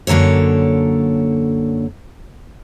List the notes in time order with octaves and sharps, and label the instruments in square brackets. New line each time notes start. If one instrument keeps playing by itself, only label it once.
[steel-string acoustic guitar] F#2 D3 A#3 A4 C#5